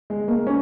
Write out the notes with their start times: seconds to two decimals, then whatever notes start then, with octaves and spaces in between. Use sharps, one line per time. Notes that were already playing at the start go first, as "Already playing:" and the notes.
0.10 G#3
0.28 A#3
0.47 C#4